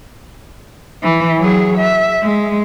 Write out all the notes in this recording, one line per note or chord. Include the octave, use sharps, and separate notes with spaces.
E3
F#3 G#4
E5
G#3